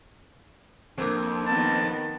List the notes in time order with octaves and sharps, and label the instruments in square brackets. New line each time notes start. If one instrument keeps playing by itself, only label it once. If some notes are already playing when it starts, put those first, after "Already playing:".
[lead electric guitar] F2 [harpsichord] A#3 C4 [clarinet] D4
[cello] D#3 B3 [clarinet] A5